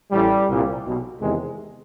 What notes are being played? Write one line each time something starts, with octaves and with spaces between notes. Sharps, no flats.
A1 A2 E3 G3
C2 A#2
B1 B2
E2 C3 D#3 G#3